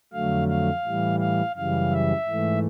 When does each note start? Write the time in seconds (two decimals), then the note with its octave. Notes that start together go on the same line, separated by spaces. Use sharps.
0.13 F2 D3 F#3 A3 F5
0.48 F5
0.85 A2 E3 G3
1.20 F5
1.56 F#2 C#3 E3 G3 F5
1.92 E5
2.27 G#2 E3 A3